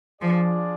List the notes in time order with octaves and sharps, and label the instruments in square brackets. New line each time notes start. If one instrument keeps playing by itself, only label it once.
[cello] F3 [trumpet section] D4 F4 G#4 D5